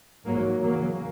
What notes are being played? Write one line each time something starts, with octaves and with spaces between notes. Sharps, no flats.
G#2 F#3 A#3
E2 C#3 F#3 A#3